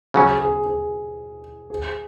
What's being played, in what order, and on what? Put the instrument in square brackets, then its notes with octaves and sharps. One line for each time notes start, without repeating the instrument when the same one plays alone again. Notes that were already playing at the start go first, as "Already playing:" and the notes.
[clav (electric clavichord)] C#3 F#3 C#4 [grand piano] G#4
[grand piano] G#4
G#4
G#4